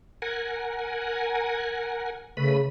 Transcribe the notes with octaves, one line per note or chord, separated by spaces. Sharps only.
A#4 F#5 G#5
C#3 A3 B4 B5